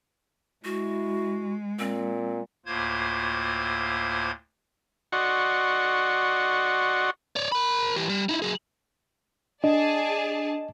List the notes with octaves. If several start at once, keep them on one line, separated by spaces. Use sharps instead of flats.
G#3 E4 F#4
A#2 C4
D2 A2 A#3 F4 C5 G#6
F#4 D5 D#5 F#5 C6 C#6
C#5 D5
A#4 B5
E3 G4
G3
D#4 E4
F#3 G#4
D4 G#4 D5 D#5 A5